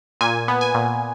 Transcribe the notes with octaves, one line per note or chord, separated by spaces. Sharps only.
A#2 G#5
B3
G#5
A#2